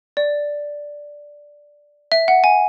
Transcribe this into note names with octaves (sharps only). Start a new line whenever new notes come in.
D5
E5
F#5
G#5